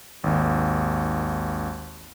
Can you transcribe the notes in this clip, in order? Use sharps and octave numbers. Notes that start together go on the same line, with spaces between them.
G#1 D#2